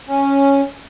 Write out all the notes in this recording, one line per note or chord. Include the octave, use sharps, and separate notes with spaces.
C#4